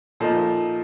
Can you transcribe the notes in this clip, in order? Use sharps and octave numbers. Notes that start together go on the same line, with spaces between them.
A#2 F3 A3 D#4 A#4 D#5